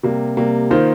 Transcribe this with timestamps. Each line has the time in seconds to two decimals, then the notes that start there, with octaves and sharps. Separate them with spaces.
0.03 C3 G3 A#3
0.37 C3 G3 A#3
0.71 D#3 A#3 F4 C5